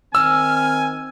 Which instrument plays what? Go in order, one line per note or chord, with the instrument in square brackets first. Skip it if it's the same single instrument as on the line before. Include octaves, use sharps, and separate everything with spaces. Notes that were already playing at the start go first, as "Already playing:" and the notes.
[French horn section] D#3 C4 [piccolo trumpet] G#5 [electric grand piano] E6 [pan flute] F6